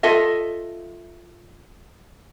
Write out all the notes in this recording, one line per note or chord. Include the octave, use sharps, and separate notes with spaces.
F4 A4 D#5 E5